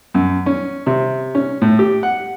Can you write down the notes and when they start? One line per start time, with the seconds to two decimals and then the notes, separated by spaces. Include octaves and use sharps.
0.14 F#2
0.46 C#4
0.87 C3
1.35 C#4
1.62 A2
1.79 G4
2.03 F#5